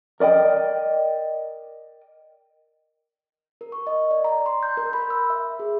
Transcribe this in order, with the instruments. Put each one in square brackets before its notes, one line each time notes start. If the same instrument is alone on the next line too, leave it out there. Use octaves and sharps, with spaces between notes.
[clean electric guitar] A#4 D5 D#5 G5
[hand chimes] A#4
C#6
D#5
D5
A#5
C6
G6
A#4
B5
E6
E5
G#4